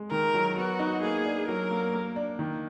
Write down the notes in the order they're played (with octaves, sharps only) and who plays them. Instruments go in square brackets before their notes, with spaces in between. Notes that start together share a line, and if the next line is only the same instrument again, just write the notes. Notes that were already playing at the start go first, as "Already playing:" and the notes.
Already playing: [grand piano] G#3
[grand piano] D#3 [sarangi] A#4
[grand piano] F#3
[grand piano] B3 [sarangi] F#4
[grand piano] D#4
[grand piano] A#3 [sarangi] G#4
[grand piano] D4
[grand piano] F#3 [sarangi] A#4
[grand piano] A#3
A#3
D4
D#3